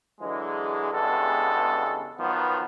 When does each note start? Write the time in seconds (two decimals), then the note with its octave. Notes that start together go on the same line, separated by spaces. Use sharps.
0.21 D3 E3 F#3 G#3
0.92 E2 G2 C#3 G#3 B3 A4
2.19 D#3 F3 F#3 B3